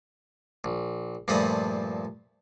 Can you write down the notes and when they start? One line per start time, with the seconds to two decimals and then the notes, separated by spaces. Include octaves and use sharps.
0.64 A#1
1.28 G2 A#2 F3 A3 B5 D#6